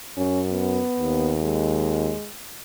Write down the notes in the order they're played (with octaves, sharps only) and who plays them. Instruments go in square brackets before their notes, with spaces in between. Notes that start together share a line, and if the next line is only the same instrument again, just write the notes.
[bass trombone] F#2 [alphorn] C#4
[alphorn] B3
[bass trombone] D#2
[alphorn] G#3